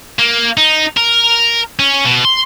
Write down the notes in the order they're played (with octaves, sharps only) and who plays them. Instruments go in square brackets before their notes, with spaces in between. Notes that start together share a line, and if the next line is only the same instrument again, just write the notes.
[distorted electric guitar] A#3
D#4
A#4
C#4
B2
C6